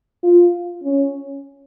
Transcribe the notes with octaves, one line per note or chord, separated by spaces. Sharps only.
F4
C#4